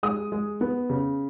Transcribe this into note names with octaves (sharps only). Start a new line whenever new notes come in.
G#3 D#6
G#3
B3
C#3